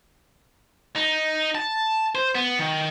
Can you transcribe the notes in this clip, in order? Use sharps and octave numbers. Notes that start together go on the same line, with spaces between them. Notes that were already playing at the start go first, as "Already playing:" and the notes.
D#4
A5
C5
B3
D#3